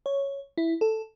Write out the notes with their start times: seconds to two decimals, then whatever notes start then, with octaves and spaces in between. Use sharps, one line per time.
0.06 C#5
0.57 E4
0.81 A4